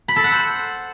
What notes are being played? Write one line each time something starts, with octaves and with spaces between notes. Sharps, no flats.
B5
A4
F#5
C5